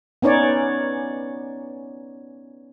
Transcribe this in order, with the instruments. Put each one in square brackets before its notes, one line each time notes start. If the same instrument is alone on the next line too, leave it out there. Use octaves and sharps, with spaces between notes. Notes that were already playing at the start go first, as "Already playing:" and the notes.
[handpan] B3 C#4 D#4 C#5 D5